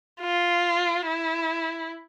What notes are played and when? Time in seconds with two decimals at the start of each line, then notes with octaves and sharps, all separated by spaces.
0.21 F4
1.07 E4